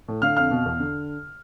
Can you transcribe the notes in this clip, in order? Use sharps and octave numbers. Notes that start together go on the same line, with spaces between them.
A2
D3 F5 F6
F2 F5 F6
B2
E2
D3